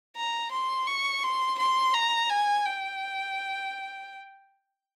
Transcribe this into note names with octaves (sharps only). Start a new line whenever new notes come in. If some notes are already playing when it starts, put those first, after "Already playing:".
A#5
C6
C#6
C6
C6
A#5
G#5
G5